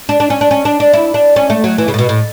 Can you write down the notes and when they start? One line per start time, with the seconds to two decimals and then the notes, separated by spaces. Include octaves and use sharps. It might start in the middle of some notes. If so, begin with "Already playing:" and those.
0.09 D4
0.20 D4
0.30 C#4
0.41 D4
0.51 C#4
0.65 D4
0.80 D4
0.94 E4
1.14 D4
1.36 C#4
1.50 A3
1.64 F#3
1.78 E3
1.88 C#3
1.94 A2
1.99 B2
2.09 A2